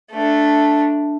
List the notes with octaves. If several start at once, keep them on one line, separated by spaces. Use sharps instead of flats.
A3 D4